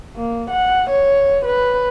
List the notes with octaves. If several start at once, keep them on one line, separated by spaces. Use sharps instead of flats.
A#3
F#5
C#5
B4